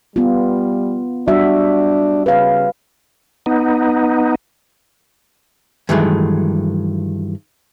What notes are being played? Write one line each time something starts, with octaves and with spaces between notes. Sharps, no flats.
G3 B3 F4
G3 D4 F#4 E5
C#3 B4 F5
B3 D#4
G2 D#3 E3 F#3 G#3 A3